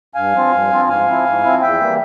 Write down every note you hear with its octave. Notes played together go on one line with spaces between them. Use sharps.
G2 F5 G#5
F3 C4 F4
G2
F3 C4 F4
G#2 F5 G#5
F3 C4 E4
G#2
F3 C4 E4
E2 E5 G5
E3 G3 A#3